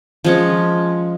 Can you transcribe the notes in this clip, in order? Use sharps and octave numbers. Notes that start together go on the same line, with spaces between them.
F3 G#3 C#4